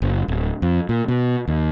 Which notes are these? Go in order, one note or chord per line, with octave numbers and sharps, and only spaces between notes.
F#1
D1
F2
A#2
B2
D#2